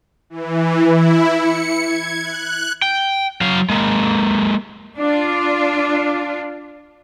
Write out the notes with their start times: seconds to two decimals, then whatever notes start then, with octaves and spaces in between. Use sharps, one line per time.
0.30 E3
0.86 E4
1.35 C#7
1.82 G#6
2.21 F#6
2.82 G5
3.41 F#3 F5
3.70 G#3 A#3
4.97 D4 F4